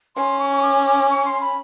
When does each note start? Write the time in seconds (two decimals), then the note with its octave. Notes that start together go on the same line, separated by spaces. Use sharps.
0.16 C#4 C6
0.39 C#6
0.62 D6
0.86 D6
1.10 C#6
1.26 C6
1.41 B5